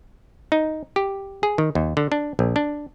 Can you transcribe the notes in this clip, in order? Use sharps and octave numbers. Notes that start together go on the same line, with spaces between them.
D#4
G4
G#4
D#3
D#2
D3
D4
A#1
D4